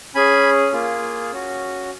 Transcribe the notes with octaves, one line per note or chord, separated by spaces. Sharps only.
C#4 G#4 G#5 B5
A#3 F4 G#4
C#4 F#4